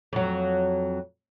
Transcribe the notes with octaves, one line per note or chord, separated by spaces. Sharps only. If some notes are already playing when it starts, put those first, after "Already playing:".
F2 F#3